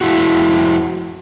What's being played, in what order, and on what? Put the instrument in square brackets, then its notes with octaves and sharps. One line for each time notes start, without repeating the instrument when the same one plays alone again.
[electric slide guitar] F2 C#3 E4 F#4